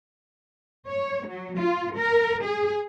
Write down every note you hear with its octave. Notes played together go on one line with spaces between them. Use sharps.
C#5
F#3
F4
A#4
G#4